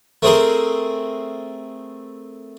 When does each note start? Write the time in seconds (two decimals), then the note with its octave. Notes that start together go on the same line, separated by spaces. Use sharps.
0.22 A3 C4 G#4 A#4 C5